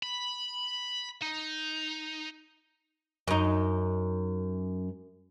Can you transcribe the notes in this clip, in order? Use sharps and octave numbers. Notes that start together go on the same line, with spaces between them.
B5
D#4
F#2 D#4